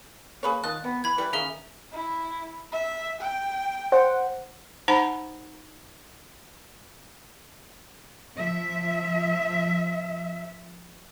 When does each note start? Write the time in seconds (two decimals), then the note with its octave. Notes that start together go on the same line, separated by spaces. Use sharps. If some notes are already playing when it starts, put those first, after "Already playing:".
0.43 A#3 G#4 B4 C#5
0.64 D#3 F4 D#5 A5 F#6
0.84 C3 B3
1.04 E3 B5 G#6
1.18 E3 G3 B4
1.33 D#3 E3 A#3 C#4 G#4 E5 G7
1.92 E4
2.72 E5
3.21 G5
3.92 C5 F#5
4.88 D#4 C5 F#5 A#5 B5
8.38 F3 E5